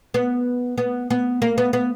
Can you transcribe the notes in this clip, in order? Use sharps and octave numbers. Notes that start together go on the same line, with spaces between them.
B3
B3
B3
A#3
B3
B3